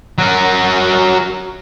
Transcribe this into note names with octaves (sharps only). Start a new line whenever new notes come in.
F#3 A#4